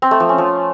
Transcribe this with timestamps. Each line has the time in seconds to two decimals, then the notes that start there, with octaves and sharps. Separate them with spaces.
0.02 C4
0.11 A3
0.20 F3
0.29 C#4
0.38 F3